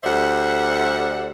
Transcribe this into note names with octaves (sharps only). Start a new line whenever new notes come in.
D2 G3 C5 D5 E5 F#5